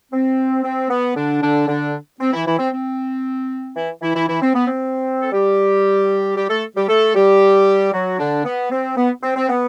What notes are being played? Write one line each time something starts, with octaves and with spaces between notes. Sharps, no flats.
C4
C4
B3
D3 D4
D3 D4
D3 D4
C4
E3 E4
E3 E4
C4
C4
E3 E4
E3 E4
E3 E4
E3 E4
C4
B3
C4
A4
G3 G4
G3 G4
A3 A4
G3 G4
A3 A4
G3 G4
F#3 F#4
D3 D4
B3
C4
B3
C4
C4
B3